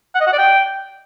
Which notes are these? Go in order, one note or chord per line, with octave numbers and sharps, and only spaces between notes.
F#5
D#5
F#5
D5
G5